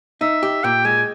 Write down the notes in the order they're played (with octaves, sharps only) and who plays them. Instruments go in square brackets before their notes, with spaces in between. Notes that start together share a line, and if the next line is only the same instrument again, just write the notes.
[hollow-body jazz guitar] D#4 [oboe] E5
[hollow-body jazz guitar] G4
[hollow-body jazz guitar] A#2 [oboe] G5
[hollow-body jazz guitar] G#3 [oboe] G#5